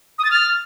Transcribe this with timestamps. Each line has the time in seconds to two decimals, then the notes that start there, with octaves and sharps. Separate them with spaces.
0.19 D#6
0.25 A6
0.31 F6